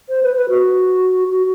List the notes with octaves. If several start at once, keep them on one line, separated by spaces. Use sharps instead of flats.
C5
B4
B4
F#4
F#4